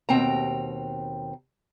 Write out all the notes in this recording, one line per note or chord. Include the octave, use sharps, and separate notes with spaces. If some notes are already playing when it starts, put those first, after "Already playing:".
D#2 B2 C4 G5 A#5